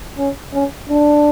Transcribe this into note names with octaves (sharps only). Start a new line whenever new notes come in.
C#4
C#4
D4